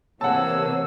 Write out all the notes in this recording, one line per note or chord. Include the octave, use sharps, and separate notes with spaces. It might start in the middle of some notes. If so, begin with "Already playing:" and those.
C3 E3 A#3 C#5 F#5 A5 E6